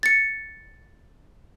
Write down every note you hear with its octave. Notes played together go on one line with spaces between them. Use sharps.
A6 C#7